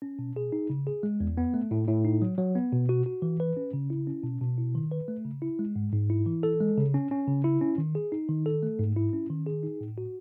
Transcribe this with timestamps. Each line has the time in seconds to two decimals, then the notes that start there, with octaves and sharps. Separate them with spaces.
0.02 C#4
0.19 B2
0.36 G#4
0.52 D#4
0.70 C#3
0.87 G#4
1.03 G#3
1.20 E2
1.37 B3
1.54 A3
1.71 A2
1.88 A2
2.04 D#4
2.22 F#3
2.38 F#3
2.55 B3
2.72 B2
2.89 F#4
3.06 F#4
3.22 E3
3.40 B4
3.57 C#4
3.73 C#3
3.90 E4
4.07 C#4
4.24 B2
4.41 B2
4.58 E4
4.75 D#3
4.91 B4
5.08 A3
5.25 C#3
5.42 E4
5.59 G#3
5.76 G#2
5.92 G#2
6.10 E4
6.26 E3
6.43 A4
6.60 G#3
6.77 C#3
6.94 C#4
7.11 C#4
7.28 C#3
7.44 E4
7.61 C#4
7.78 D#3
7.95 G#4
8.12 D#4
8.29 D#3
8.46 A4
8.63 A3
8.79 G#2
8.96 E4
9.13 C#4
9.30 D#3
9.46 G#4
9.63 D#4
9.81 A2
9.98 F#4